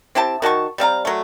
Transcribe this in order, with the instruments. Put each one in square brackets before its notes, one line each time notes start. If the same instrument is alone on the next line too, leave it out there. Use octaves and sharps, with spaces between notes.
[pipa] C4 E4 G4 A5
D#3 F#4 A5 C#6
G3 C4 F5 A#5
F#3 A3